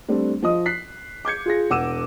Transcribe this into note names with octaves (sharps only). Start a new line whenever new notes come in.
G3 A3 C4 D4
F3 D#5 D#6
F#6 B6 C7
D6 G6 G#6 C#7
F4 G#4 A#6
E1 F#5 D6 E6 D#7 E7